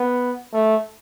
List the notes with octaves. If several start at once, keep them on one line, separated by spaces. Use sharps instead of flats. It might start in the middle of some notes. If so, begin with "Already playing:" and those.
Already playing: B3
A3